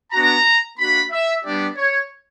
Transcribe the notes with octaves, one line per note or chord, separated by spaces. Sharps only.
B3 D4 F#4 A#5
A#3 D4 F#4 B5
E5
G3 B3 D4 G4 D5
C#5